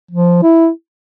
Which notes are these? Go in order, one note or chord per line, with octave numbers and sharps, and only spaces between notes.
F3
E4